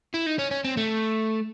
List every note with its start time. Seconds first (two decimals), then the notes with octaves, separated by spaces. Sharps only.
0.14 E4
0.26 D#4
0.39 C#4
0.51 C#4
0.65 C4
0.77 A3